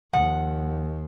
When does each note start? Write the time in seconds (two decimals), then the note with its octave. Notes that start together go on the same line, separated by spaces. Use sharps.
0.13 D#2 F3 F#5